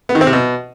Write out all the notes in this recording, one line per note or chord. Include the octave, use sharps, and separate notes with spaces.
B3
D#3
C4
C3
B2